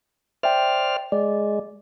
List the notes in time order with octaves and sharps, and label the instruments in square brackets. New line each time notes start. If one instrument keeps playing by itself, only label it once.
[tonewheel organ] C5 D5 F6 [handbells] E5 G5
[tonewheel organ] G#3 [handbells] D5